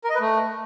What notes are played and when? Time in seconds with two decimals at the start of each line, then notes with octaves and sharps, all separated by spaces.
0.04 A#4
0.10 D#5
0.15 B4
0.20 A3